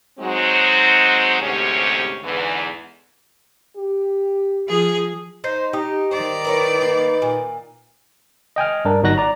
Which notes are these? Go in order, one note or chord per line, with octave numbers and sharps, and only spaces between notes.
F#3 G#3 C4 D#4 F#4
D2 G#2 C3 C#4 G4 C#5
E2 G#2 D3 E3
G4
F3 G#4
D#4 C5
D#4 G4
D#3 C5 D5
E4 A#4 B4 C#5
A#3
A#2
D#5 G5 G#5 F6
G2 D4 A#4
G1 F#3 D#4 F#4 F#6 A#6
D5 A#5